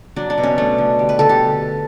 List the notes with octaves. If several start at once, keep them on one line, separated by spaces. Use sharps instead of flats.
F#3 D4
D4
B2
C#4
A3 D4
D3
G3
B4
D3 A4
G4